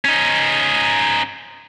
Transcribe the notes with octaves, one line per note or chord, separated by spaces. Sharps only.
C#4 D#4